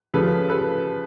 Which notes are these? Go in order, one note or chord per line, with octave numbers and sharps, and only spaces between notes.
C#3 F3 A4 B4
A4 B4